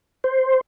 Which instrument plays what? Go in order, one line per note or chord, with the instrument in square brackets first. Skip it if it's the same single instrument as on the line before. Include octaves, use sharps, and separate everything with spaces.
[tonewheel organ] C5